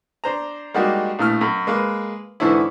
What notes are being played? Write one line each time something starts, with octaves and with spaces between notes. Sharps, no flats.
D4 C5 A#5
G3 G#3 A#3 D#4 F#4 G4
A#1 A2 F6
F#2
G#3 A#3 B4
G#2 D3 E3 C#4 E4